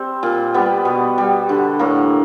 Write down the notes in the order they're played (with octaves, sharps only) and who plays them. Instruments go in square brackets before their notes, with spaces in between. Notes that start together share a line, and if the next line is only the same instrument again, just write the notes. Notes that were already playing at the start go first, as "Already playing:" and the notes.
Already playing: [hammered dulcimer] G3 C4
A#2
G3 B3
B2
G3
D3
A2 A#3